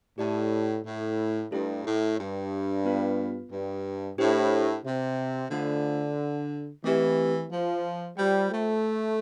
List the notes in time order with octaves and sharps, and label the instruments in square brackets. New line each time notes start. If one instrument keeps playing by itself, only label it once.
[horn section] A2 [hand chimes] G4 D5 A5
[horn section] A2
[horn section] G2 [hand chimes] A3 E4 A4
[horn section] A2
G2
[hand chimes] B3 F4 B4 F5
[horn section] G2
[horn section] A2 [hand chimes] D4 G4 C5
[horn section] C3
[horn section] D3 [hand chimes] A3 D4 F4 C5 F5
[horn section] E3 [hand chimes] A3 C4 G4 B4
[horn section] F3
[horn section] G3 [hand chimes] F4 C5 G5
[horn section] A3